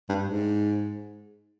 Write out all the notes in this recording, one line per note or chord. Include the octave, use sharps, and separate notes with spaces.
G2
G#2